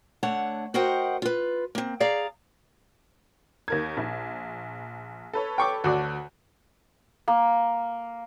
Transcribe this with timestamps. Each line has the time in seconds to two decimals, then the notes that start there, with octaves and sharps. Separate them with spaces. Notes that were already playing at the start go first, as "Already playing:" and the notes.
0.23 D3 A3 C#5 F#5 A5
0.74 F#4 A#4 C5 D#5 F#5 G5
1.22 F4 B4
1.75 A#3 C4
2.00 G#4 D5 F5 A#5
3.68 D#2 A#4 G#6
3.97 A#1
5.33 A4 B4 C#5
5.58 G5 C#6 D6
5.84 D2 F#4 D5
7.28 A#3